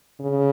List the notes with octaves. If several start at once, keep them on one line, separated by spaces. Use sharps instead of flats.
C#3